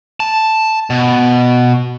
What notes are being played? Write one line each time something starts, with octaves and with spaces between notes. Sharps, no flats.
A5
B2